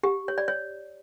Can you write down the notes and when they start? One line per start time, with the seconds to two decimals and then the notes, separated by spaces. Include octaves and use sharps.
0.03 G4
0.28 C#5
0.38 D5
0.48 C#5